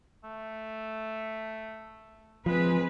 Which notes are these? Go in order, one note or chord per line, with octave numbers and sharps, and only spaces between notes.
A3
F3 G#3 C4 G#4 B4